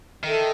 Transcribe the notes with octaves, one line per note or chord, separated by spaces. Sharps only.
D#3 A4 E5 G5